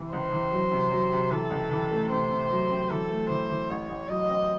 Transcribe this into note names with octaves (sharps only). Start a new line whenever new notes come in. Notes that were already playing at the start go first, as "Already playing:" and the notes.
Already playing: C3 E3
C#2 C5
E3
F#3
C3
F#3
C3
E3 A4
C#2
E3
A3
C3 C5
C3
F#3
C4
E3 A4
A3
E3 C5
E3
A1 C#5
A1
F#3 D#5
C4